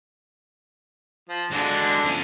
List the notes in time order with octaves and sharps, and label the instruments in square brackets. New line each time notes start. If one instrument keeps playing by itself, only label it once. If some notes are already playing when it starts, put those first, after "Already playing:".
[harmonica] F3
[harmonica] D3 [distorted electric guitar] G#3 F#4
[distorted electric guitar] F3 C#4